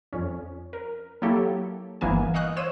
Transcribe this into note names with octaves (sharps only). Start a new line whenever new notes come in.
F2 C#4
A#4
F#3 A#3 E4 G4 A4
G1 E3 A#3 B3 G#5
D#5 F5 C#6 D#6 F#6
C5 C#5 E6 D#7 E7